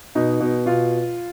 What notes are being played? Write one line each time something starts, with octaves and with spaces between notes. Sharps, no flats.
B2 D#4
B2
B2 F4